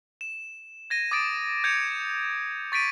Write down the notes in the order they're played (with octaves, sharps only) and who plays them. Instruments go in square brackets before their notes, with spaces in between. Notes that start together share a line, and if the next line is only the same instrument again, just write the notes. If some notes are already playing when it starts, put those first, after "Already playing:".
[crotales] E7
G#6 A#6 D#7
D6 D#6 A6 D7
G6 G#6 C#7 F7
C#6 A6 B6 D7 D#7